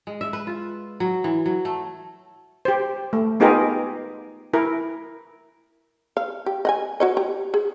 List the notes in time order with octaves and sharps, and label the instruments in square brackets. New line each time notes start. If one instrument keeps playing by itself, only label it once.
[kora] G#3
E5
B4
F4
F#3
E3
F#3
A3
[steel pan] G4 C5
A3
B3 D#4 F4 G4 G#4 A#4
E4 A#4
[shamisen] F5
G4
D#5 F#5 G#5
F#4 C#5 D#5
G4
G#4